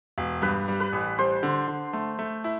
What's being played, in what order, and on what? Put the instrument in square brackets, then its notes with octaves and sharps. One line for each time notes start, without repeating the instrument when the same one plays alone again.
[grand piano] E1
[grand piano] G2 [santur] B4
[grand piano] G3
[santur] B4
[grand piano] A1
[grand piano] G3 [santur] C5
[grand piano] D3
D3
A3
A3
E4